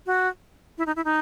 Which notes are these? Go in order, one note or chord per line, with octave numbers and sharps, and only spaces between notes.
F#4
E4
D#4
E4
D#4